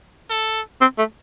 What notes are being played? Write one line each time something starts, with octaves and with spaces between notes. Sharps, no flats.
A4
C4
A3